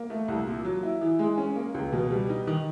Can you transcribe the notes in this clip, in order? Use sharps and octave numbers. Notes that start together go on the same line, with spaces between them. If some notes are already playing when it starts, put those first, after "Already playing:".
Already playing: A#3
A3
C2
A#2
F#3
E4
E3
G#3
C#4
A#3
C#2
B2
G3
D#4
D#3